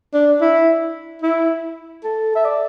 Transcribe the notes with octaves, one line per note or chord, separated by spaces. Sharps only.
D4
E4
E4
A4
E5
D5